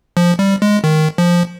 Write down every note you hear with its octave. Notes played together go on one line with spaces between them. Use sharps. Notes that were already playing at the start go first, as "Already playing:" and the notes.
F3
G3
G#3
D#3
F3